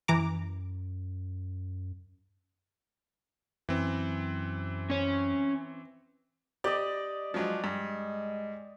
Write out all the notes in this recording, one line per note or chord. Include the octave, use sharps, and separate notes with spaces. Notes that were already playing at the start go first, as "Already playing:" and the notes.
F#2 E3 A#5 D6
F#2 E3 C4
C#4 C#5
G4 D5 D#5
F3 F#3 G#3 D4
G2 G#3